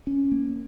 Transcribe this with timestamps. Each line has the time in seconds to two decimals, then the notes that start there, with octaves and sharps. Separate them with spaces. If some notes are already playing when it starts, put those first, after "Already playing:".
0.07 C#4
0.32 A#3